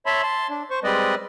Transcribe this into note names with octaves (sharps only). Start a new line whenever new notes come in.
C#5 E5 A5 B5 C6
A5 C6
D4
C5 C#6
G3 G#3 C4 B4 D5 D#5